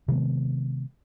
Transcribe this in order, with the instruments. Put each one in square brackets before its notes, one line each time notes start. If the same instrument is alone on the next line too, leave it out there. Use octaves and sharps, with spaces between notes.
[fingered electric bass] C3 D#3 G#3 B3